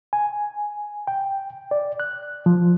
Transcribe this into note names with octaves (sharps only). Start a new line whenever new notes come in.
G#5
G5
D5
F#6
F3